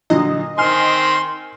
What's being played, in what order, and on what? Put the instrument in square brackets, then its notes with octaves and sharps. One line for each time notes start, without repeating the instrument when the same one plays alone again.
[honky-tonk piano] A#2 D3 F#3 [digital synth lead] D#5
[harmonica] D#3 C4 [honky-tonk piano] G#5 F6 [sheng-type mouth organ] C6